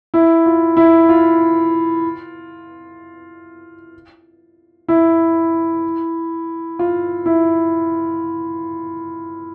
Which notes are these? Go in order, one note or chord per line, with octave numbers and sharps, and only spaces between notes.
E4
F4
E4
F4
E4
F4
E4